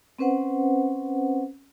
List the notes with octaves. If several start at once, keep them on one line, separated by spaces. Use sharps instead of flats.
C4 C#4 B4 C5 F#5